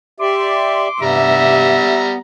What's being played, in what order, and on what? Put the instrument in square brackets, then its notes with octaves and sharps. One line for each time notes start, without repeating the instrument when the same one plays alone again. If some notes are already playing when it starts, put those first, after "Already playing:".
[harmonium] G4 D5 E5 [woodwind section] C6 D6
[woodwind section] G2 C3 [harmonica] G3 A#5 [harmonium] B3 [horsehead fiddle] E5